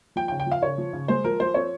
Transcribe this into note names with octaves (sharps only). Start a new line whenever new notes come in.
F3 G5
G5
C#3
G5
F3
F5
C#3 C#5
F3
C#3
G#3 C5
F3 A#4
F3 C5
C4 C#5